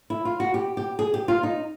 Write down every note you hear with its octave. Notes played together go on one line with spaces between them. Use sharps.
E4
F4
F#4
G4
G4
G#4
G4
F4
D#4